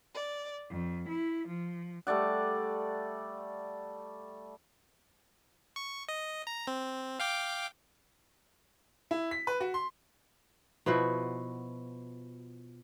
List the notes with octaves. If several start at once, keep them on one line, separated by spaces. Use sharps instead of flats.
D5
F2
E4
F3
G3 A3 D5 F#5
C#6
D#5
A#5
C4
F5 G5 D6
E4
B6
B4
F#4
C6
B2 F3 E4 F#4